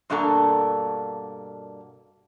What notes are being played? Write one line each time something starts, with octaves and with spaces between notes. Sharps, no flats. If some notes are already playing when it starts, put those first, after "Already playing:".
G2 B2 A#3 D4 A4 A#5